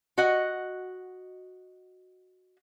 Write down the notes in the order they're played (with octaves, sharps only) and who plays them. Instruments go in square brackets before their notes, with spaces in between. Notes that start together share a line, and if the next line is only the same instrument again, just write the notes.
[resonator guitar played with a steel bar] F#4 D#5 F#5